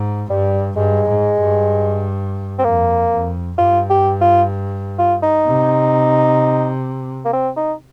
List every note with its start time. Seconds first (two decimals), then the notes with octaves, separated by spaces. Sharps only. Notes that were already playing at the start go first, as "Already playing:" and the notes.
Already playing: G#2
0.30 G2 G3
0.76 G2 G#3
1.09 G#2
1.40 G2
2.59 C4
2.64 F2 A#3
3.11 F2
3.58 G2 F4
3.90 G4
4.21 F4
4.98 F4
5.22 D#4
5.46 C3
7.25 A#3
7.33 C4
7.56 D#4